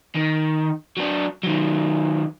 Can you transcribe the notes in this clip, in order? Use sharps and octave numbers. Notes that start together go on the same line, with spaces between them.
D#3
F#3 D4
D#3 F#3